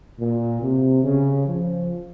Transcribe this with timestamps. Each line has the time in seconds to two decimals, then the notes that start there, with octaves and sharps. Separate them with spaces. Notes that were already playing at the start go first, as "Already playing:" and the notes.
0.18 A#2
0.61 C3
1.03 C#3
1.46 F3